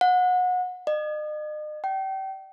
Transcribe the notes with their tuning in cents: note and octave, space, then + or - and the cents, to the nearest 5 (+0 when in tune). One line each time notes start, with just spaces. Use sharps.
F#5 -25
D#5 -40
G5 -30